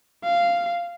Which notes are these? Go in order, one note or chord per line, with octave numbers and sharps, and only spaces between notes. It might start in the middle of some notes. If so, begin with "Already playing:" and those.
F5